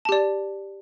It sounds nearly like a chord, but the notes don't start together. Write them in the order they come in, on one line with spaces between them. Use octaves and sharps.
A5 G4 D5